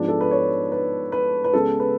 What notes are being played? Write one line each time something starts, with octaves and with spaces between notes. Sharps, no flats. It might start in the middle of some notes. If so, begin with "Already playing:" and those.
Already playing: G#2 F3 G#3 B3 D4
A4
B4
C#5
B4
B4
B4
C#2 C#3 G#3 B3 A4
B4